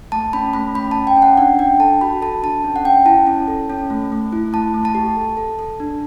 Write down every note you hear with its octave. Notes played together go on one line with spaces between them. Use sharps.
A3 A5
C#4 B5
A3 B5
C#4 B5
A5
C#4
G5
C#4
F#5
D4 F#5
D4 G5
A4 A5
F#4 B5
A4 A5
D4 A5
C#4
F#5
C#4 G5
E4 A5
C#4
A4
C#4
A3
A3
E4
A3 A5
A3
A5
G4
A4
A4
A4
D4